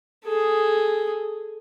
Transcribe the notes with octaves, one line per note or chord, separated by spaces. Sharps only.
G#4 A4